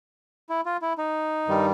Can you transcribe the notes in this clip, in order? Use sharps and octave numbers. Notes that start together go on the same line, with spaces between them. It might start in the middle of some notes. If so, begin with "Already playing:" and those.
E4
F4
E4
D#4
G2 D#3 G3